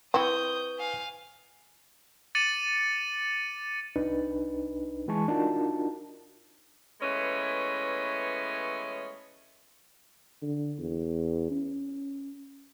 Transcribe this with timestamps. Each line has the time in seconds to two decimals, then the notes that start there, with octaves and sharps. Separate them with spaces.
0.14 C4 E4 B4 C#6 D#6 G6
0.78 F5 G#5
2.35 D6 A6 C#7 D#7 F#7
3.96 C2 D4 D#4 B4
5.08 E3 G#3 G#5 A5 C#6
5.28 D4 D#4 F4 F#4 A#4 A5
7.01 E3 G#3 A3 B3 C#4 C#5
10.42 D3
10.79 E2
11.51 C#4